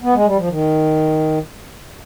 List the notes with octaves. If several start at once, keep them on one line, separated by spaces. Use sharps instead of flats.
B3
G#3
G3
F3
D#3